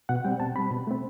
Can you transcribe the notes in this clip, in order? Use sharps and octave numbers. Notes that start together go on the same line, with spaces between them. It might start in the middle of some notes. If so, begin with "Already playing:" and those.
B2 F#5
G3 C4 G5
B2 A5
G3 C4 B5
B2
A3 C4